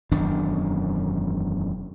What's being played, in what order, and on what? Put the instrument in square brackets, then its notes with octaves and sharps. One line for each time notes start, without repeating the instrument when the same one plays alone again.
[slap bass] E1 F#2 D#3 D4